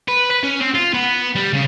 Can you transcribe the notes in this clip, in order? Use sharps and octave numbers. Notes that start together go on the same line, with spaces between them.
B4
B4
C#4
C4
F4
B3
G3
C#3